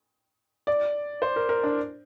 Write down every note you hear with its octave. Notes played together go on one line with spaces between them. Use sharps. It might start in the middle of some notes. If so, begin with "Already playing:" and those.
D5
C5
A#4
A#4
D4